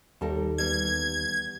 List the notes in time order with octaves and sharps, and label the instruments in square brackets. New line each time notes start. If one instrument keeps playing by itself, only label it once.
[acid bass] D#2 [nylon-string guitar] G3 A4 A#4
[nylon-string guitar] E2 G3 [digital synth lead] G#6